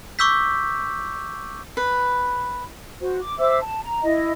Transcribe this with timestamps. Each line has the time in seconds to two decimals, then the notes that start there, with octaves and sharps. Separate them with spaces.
0.19 C#6 D6 E6 G6 B6
1.77 B4
3.01 F#4 C5
3.21 D6
3.39 C5 E5 D6 E6
3.62 A5
3.83 A#5
4.03 E4 D#5